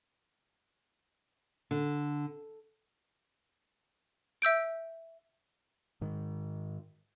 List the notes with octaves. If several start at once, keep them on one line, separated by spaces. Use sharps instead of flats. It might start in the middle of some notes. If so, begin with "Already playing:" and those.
D3
E5 E6 G6 D7
G#2 D#3